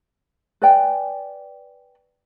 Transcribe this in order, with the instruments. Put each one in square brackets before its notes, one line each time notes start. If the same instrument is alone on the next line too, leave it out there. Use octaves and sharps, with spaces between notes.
[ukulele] B4 D5 G5 G#5